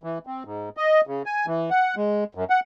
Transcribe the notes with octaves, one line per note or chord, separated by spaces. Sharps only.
E3
C4
G#2
D#5
C#3
G#5
E3
F#5
G#3
F#2
F#5